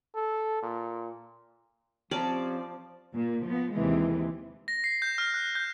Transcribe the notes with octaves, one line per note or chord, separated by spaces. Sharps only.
A4
A#2
F3 C4 C#4 G4 D5 A5 A#5
A#2
F3 B3
D#2 C3 E3 G#3
A#6
C7
G6
F6
F#6
G6